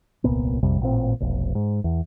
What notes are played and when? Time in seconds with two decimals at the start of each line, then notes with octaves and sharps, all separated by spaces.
0.24 D#1 C2 A#2 B3
0.63 A#1 F2 C3 G3
0.81 A1 A#2 C4
1.20 F1 B1
1.55 G#2
1.84 E2